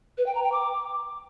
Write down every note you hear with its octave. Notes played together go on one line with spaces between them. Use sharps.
B4
G5
A#5
G5
D6